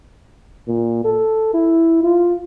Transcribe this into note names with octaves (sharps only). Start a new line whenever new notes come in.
A#2
A4
E4
F4